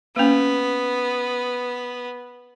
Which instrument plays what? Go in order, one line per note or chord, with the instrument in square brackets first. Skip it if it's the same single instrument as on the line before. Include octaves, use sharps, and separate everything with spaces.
[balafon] A#3 C#4 [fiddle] B3